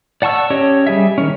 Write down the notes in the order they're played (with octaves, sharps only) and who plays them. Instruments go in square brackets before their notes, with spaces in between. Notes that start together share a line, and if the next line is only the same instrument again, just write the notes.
[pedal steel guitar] D5 F#5 A5 C#6 E6
C#4 G4 C#5 D#5
G3 G#4 E5
D#3 A3 C#4